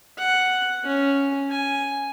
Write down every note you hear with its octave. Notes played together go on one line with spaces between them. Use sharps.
F#5
C#4
G#5